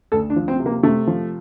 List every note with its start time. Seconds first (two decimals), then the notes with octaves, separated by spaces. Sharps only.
0.12 D2 A4
0.30 D4
0.36 F3
0.48 C4
0.60 C3
0.66 A#3
0.83 C3 A3
1.07 F3